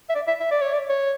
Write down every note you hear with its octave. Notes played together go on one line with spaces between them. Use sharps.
E5
D5
E5
E5
D5
C#5
D5
C#5